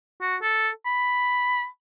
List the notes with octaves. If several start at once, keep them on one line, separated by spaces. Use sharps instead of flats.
F#4
A4
B5